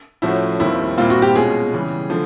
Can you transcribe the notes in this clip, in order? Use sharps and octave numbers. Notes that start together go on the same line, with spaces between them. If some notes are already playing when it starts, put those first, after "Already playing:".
A2 F3 A3 C#4 E4 F#4
D#2 D#3 G3 C4 E4 F4
A#2 G3 C4 E4 F4
F#4
G4
B2 G#3 C#4 F4 G#4
C#3 E3 G3
D3 F3 A3